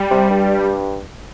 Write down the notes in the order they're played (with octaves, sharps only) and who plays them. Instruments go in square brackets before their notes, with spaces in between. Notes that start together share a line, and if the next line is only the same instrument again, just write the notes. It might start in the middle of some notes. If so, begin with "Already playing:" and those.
Already playing: [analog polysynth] G3
[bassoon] C3
G2